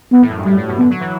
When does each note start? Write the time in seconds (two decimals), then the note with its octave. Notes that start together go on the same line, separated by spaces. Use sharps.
0.12 E3 B3
0.21 A2
0.29 F#2
0.38 G2
0.46 A2 G3
0.57 A2
0.68 B2
0.79 D3 B3
0.90 F#3
1.00 E3